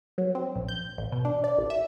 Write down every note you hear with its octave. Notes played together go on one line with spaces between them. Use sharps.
F#3
C4
A#1
G6
A1
B2
D4
D5
A1
E5